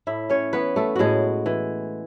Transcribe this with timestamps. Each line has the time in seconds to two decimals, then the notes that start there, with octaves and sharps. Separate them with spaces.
0.07 A2 E4 E5
0.30 C#4 C#5
0.53 E3 B3 B4
0.76 A3 A4
0.96 A2 G#3 F#4 G#4
1.46 E3